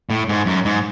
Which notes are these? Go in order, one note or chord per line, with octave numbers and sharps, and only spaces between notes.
A2
G#2
F#2
G#2